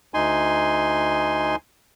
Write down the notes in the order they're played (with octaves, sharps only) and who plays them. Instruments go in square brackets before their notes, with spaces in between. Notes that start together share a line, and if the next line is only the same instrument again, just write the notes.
[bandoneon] D2 D#4 G#5 C6